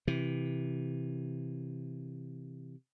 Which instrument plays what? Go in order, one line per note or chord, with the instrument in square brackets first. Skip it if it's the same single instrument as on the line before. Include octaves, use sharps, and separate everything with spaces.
[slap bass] C3 E3